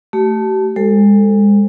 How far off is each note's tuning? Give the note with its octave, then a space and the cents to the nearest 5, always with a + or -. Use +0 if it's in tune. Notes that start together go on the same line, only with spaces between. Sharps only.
A3 +0 G4 -40
G#3 -30 A4 +20 C5 +0